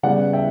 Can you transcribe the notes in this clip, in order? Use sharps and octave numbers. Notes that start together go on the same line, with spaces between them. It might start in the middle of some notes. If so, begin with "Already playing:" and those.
C#3 G3 B3 D5 F#5
E5 G5